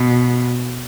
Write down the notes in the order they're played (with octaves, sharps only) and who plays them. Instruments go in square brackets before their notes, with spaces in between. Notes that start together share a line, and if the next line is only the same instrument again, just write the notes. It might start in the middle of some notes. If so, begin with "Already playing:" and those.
Already playing: [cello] B2